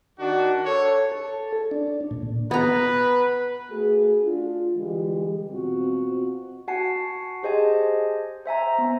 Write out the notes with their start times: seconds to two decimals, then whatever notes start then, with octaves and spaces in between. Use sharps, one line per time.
0.19 D#3 D4 F#4
0.65 A4 C#5
1.12 A4
1.71 D4
2.11 A#2
2.51 B3 B4 A#5
3.70 A3 F#4 G#4
4.22 D4 F4
4.75 D3 E3 G3 G#3
5.51 B2 C4 F4 F#4
6.68 F#4 F#5 G#5 A5 C7
7.43 G4 G#4 C5 D#5 G#5 A5
8.46 C5 E5 G#5 A#5
8.78 B3